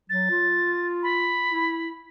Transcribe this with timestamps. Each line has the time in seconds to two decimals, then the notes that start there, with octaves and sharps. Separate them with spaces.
0.10 F#3 A6
0.30 F4
1.03 B5
1.51 E4